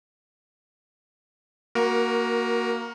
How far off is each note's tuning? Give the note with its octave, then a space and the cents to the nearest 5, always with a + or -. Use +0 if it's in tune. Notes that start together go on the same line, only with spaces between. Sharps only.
A#3 +0 F#4 +0 A#4 +20